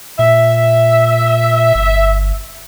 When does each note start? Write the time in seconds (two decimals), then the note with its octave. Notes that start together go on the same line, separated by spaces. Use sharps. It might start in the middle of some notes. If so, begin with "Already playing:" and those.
0.19 A#2 E5
1.75 G1